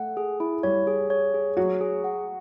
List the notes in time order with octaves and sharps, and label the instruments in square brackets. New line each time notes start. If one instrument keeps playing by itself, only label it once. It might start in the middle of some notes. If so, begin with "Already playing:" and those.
Already playing: [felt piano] A3 A4 [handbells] F#5
[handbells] G#4
E4
[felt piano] G3 G4 [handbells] C#5
[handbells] G#4
C#5
G#4
[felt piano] F#3 F#4 [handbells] C#5
[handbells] G#4
F#5